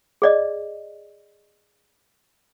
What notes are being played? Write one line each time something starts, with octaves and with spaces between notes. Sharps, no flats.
G#4 D5 D#5